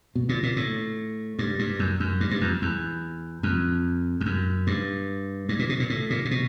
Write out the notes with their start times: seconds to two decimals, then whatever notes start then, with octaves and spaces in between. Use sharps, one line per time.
0.15 B2
0.29 A#2
0.43 A#2
0.56 A2
1.39 G2
1.59 G2
1.79 F#2
2.00 F#2
2.20 G2
2.31 G2
2.41 F2
2.62 E2
3.43 F2
4.21 F2
4.26 F#2
4.67 G2
5.49 G2
5.59 A#2
5.69 B2
5.80 A#2
5.90 A2
6.10 A#2
6.25 A#2
6.31 B2